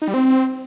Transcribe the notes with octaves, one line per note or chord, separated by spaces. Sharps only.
D#4
G3
C4